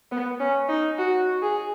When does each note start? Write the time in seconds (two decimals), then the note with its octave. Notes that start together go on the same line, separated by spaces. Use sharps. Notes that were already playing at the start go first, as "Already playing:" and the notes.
0.12 B3
0.40 C#4
0.69 D#4
0.98 F#4
1.42 G#4